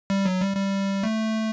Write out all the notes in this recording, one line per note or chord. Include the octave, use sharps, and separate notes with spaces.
G3
F#3
G3
G3
A3